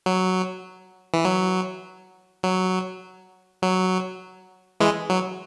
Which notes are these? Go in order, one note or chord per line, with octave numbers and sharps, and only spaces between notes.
F#3
E3
F#3
F#3
F#3
E3 G#3
F#3